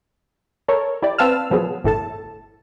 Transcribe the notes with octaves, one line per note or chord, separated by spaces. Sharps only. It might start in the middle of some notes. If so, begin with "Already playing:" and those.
A4 A#4 C#5
E4 G4 D5
C4 B4 F5 A5 E6 F6
A#2 F3 F#3 B3 G#4
G1 A2 A4 A5